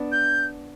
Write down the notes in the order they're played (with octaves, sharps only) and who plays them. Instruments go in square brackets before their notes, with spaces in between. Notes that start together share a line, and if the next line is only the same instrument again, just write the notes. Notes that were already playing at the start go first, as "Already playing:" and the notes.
Already playing: [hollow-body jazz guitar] B3 D4
[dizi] G6